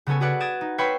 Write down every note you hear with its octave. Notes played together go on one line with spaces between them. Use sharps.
C#3 B3 C#4 A4 G#5
F#4 G#4 A4 B4 D5 F#5
D#6 G#6 A6 D7 E7
D#4
B4 C#5 E5 G5 B5 C6